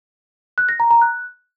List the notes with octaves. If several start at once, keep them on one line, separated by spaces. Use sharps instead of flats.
F#6
A#6
A#5
A#5
F#6